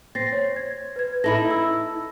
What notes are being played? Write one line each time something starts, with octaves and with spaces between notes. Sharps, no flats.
C4 A6 A#6 C7
C#5
G#6
B4 G#6
D#4 E4 A4 B5 A#6
E6